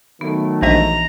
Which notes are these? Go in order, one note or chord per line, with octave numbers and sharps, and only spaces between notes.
D#3 F#3 A3 B3
A#1 E3 D#5 E5 A#5 A#6